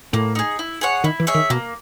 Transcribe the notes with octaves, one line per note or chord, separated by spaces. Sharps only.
A2 A#3
D#4 G#4
E4
G#4 C#5 F#5
D#3 E4
E3
G#4 C#5 E5
D#3
B2 A#3